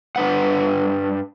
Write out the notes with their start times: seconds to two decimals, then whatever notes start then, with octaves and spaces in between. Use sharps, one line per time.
0.16 G2 D4 B4 F#5